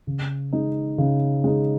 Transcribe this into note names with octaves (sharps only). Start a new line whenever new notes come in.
C#3
G#3 D#4
C#3
G#3 D#4